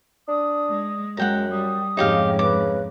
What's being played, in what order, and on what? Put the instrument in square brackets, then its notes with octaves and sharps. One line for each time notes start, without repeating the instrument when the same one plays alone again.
[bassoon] D4 [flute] D#6
[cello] G#3
[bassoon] F#2 [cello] G#3 [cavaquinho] F#5 G5 A#5
[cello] G3 [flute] D#6
[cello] F2 G#2 [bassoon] C#3 [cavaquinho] D#4 G4 F5
[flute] B4 [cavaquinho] D6